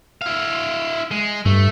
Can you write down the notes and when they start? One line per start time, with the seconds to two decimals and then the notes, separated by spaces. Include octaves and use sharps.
0.22 E4 F5
1.11 G#3
1.46 G2 A3